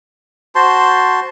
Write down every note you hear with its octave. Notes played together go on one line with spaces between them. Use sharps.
F#4 C5 A5 C6